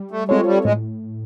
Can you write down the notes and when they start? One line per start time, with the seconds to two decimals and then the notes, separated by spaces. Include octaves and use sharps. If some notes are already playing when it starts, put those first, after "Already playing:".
Already playing: G3
0.11 A3
0.28 G#3 C4 F4 A4 C#5
0.46 G3
0.65 A2 G#3